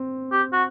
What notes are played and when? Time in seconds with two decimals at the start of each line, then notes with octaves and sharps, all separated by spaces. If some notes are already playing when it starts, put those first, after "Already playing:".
Already playing: C4
0.32 G4
0.53 F#4